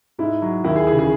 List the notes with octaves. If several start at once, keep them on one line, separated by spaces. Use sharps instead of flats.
G#2 E4
F#3
D#2 E4
G#4
E3 G#4
C#3
G#4